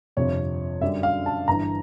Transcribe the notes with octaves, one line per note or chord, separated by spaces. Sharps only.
G1 F2 C3 F3 C#5
F#2 D3 G3 E5
F5
A5
G1 G2 E3 A#5